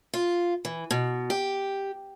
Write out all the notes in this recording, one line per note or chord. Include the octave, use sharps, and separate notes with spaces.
F4
E3
B2
G4